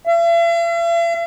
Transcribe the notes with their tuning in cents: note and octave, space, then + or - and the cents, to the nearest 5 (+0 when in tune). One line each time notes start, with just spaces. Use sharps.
E5 +45